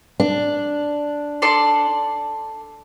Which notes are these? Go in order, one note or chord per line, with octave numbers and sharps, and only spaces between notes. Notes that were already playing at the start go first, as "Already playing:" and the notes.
D4
A4 D5 C6